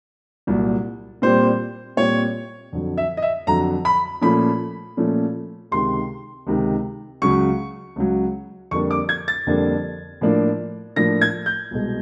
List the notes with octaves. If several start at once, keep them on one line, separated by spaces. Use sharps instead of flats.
C2 A#2 F#3
A#2 G3 C4 C5
A#2 G3 C4 C#5
F2 D3 F#3
E5
D#5
E5
F2 D3 F#3 A#5
B5
A#2 F3 A3 C#4 B5
A#2 F3 A3 C#4
C#2 C3 D#3 C6
C#2 C3 D#3
C#2 C#3 F#3 C#6
C#2 C#3 F#3
F2 D3 G3 A#3 D4 C#6
D6
G#6
A6
F2 D3 G3 A#3 D4
A2 F3 A#3 D4
A2 F3 A#3 D4 A#6
G#6
G6
C2 B2 G#3